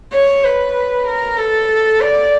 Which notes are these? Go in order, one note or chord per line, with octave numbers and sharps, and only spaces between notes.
C#5
B4
A#4
A4
D5